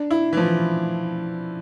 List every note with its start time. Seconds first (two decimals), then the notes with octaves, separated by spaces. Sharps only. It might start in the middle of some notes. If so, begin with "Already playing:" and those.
Already playing: D4
0.11 E4
0.33 E3
0.37 F3